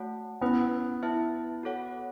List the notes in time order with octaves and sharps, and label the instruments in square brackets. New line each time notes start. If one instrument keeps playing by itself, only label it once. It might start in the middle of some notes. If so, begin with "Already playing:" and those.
Already playing: [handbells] A3 F#4 C#5 F#5 A5
[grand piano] B3 [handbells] C#4 E4 B4
[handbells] E4 B4 E5 A5
F#4 A4 C#5 F#5